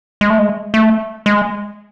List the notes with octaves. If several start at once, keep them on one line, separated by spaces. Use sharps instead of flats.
G#3
A3
G#3
A3
G#3